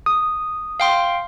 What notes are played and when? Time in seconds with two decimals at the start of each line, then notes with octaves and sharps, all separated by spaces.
0.06 D#6
0.80 F5 G5 C6